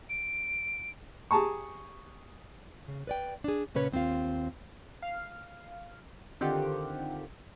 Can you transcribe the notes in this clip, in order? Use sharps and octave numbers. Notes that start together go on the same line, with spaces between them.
D7
G4 G#4 A5 A#5 C#6
C#3
B4 D5 G5
D4 G#4
A#2 C#3 C#4 B4 C#5
D#2 C4 E4 F4 F5
F5
D3 D#3 C4 F4 G4 F#5